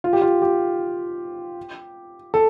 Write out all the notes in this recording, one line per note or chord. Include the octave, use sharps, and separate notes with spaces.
F4
G4
F4
G4
A4